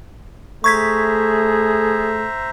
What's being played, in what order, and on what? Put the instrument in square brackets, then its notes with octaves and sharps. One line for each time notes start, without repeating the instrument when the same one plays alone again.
[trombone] A3 [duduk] G#4 [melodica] C5 E5 A#5 [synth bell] C#6 G#6 B6